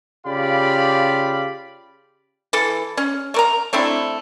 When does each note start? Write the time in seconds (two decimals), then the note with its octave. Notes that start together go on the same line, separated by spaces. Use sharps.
0.25 C#3 F4 G4 D5 F5 B5
2.53 E3 A4
2.97 C#4
3.34 A3 A#4 A#5
3.73 A3 C4 D4 E4